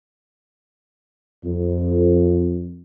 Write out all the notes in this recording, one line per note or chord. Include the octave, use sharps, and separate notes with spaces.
F2